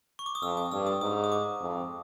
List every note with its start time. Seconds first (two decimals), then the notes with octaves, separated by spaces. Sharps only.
0.19 C#6
0.26 D6
0.35 D#6
0.42 F2 E6
0.57 D#6
0.71 G2 E6
0.86 D#6
1.01 G#2 D#6
1.24 D#6
1.32 D6
1.61 F2